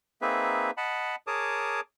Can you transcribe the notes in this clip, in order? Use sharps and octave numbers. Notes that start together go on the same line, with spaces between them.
A#3 C4 D#4 G#4 B4 E5
D#5 F#5 A5 B5
G#4 A#4 C#5 A5 D6 D#6